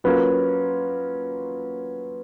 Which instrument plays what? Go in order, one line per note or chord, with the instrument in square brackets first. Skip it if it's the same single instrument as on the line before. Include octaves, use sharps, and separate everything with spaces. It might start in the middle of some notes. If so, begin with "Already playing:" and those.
[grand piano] F#3 A#3 C#4 F4 A#4 [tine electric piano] B4